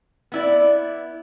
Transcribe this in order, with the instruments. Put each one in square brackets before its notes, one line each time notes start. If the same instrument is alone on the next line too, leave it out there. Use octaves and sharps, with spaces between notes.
[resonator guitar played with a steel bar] B3 E4 D5